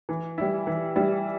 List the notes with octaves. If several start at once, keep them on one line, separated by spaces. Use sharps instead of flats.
E3
G3 E4
E3
G3 E4